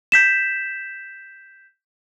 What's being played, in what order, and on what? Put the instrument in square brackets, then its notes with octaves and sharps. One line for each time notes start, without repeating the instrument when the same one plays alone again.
[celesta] G6 B6 E7